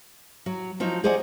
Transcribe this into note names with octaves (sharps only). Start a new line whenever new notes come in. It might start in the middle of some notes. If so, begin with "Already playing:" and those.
F#3
F3 F#3 D#4
G#4 C5 D5 D#5 F#5 G#5